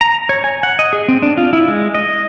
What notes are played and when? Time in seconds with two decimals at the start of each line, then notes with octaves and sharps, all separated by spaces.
0.01 A#5
0.29 C#5
0.44 G#5
0.63 F#5
0.79 D#5
0.93 G#4
1.08 C4
1.22 D4
1.37 F4
1.53 E4
1.68 G#3
1.95 D#5